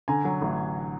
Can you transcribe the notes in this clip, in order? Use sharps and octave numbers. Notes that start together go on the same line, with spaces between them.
D3 G#5 A#5
F#3
A1